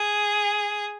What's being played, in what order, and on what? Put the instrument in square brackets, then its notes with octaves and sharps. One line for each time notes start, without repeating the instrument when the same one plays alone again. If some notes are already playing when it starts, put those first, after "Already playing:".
Already playing: [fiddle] G#4